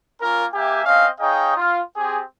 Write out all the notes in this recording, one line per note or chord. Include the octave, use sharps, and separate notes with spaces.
A#3 C#4 F4 A#4
A#3 G4 E5 G5 G#5
C4 C#4 D#5 F5
D#4 G#4 C#5 D#5 F5 G5
F4
C4 G4 G#4